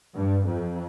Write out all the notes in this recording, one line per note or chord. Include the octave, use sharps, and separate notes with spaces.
G2
F2